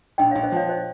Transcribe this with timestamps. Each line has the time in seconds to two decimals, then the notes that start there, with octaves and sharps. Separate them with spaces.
0.18 A#1 D#5 G5
0.31 A#1 C#5 F5
0.43 C5 D#5
0.52 F3 C#5 F5
0.69 C5 D#5